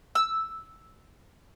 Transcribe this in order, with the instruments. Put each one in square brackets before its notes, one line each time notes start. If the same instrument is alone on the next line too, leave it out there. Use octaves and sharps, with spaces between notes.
[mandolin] E6